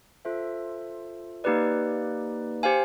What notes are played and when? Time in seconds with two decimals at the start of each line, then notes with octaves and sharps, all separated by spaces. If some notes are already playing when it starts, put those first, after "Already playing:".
0.25 F4 A4 C5 E5
1.44 A#3 D#4 G4 B4 D5
2.63 G4 C5 F5 G#5